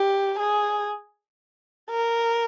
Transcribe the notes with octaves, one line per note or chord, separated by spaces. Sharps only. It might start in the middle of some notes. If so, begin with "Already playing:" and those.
Already playing: G4
G#4
A#4